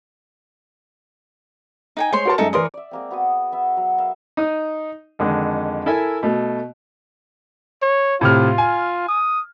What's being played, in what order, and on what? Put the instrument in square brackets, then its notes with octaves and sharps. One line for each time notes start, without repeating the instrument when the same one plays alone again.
[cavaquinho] D#4 G5 G#5
[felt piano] G#3 [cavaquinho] C5 C#5 C6
[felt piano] F#4 A#4 A5
[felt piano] F#2 G#3 C#7 [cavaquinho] D#4 A4 E5
[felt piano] E3 A#4 D5 [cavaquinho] C6 D#6
[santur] D5 E5
G#3 A#3 C4
B3 F#4 G#4 D#6
B3 E5
F#3
A#4 E5 F5
[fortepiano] D#4 D#6
F2 D3 D#3 G#3
E4 A4 A#4 E5 G#5
B2 A3
[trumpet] C#5
[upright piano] A2 C3 F6 [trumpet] F4
[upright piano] G#5
[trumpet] D#6